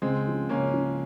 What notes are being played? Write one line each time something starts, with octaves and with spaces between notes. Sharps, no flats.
C#2 G#3 C4
C#3 F3
C#2 A#3 C#4
C#3 F3